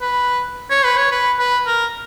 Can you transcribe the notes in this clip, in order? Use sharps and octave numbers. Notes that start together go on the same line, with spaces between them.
B4
C#5
B4
C#5
B4
B4
A#4